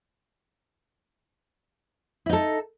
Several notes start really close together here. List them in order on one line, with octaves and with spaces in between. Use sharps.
E4 D#4 A4